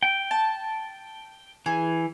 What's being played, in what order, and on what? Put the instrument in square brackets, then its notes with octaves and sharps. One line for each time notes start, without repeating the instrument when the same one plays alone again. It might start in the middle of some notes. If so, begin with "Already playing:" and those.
[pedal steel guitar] G5
[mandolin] A5
[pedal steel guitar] E3 [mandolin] G#4